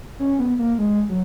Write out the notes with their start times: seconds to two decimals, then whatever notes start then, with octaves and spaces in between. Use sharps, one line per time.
0.19 C#4
0.39 B3
0.59 A#3
0.78 G#3
1.09 F#3